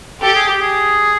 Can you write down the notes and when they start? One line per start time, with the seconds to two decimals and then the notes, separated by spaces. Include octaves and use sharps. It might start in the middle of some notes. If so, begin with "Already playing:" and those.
0.22 G4 A4
0.35 G#4
0.48 G4
0.61 G#4